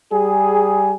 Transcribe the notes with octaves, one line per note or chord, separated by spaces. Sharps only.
G3 G#4